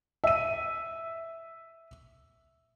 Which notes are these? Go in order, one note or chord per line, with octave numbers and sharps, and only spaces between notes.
E5 D#7